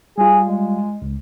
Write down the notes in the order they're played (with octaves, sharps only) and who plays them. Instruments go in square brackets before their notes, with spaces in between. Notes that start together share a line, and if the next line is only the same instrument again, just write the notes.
[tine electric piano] G3 F4 [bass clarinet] G#4
[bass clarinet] G#3
[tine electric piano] C#2